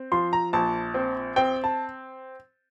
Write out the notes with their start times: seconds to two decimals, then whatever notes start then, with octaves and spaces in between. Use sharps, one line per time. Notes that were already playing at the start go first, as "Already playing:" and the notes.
Already playing: C4
0.12 F3 C6
0.33 A#5
0.53 A#1 A5
0.94 C4
1.36 C4 G5
1.64 A5